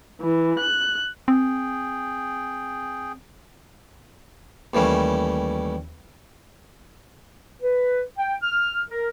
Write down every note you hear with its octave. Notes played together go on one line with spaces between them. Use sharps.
E3
F#6
C4 G#4 G5
D#2 E3 G3 A3 C#4
B4
G5
F6
A#4